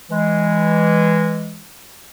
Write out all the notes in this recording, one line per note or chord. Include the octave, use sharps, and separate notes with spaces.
E3 G#3